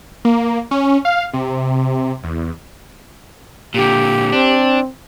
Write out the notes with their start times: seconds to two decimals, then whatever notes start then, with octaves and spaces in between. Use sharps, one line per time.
0.25 A#3
0.71 C#4
1.05 F5
1.34 C3
2.24 E2
3.74 A#2 D3 G4
4.32 C4 D4